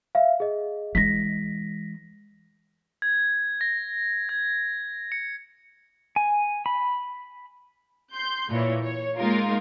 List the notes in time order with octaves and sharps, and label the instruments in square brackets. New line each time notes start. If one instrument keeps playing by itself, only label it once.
[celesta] E5 F5
G#4 D#5
[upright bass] E3 G#3 [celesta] A#6 B6
[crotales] G#6
A#6
G#6
C#7
[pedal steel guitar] G#5
B5
[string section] C6 G6
A#2 E3 C#5
C#5
G#3 A#3 D#4 F4 A#4